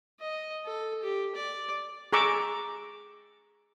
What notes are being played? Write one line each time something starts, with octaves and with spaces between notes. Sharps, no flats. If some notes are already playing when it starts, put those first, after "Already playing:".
D#5
A4
G4
D5
G#4 A#5 C#6 D6 E6